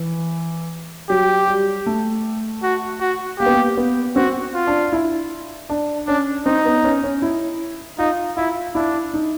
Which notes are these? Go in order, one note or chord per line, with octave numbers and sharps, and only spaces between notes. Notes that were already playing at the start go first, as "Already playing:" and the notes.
Already playing: E3
F#3 G4
G3
A3
F#4
F#4
A#3 G4
B3
A#3
B3
C4 F#4
F4
D4
E4
D4
C#4 D4
C4 D#4
B3
C#4
C#4
E4
D#4 F4
E4 F4
D4 E4
D#4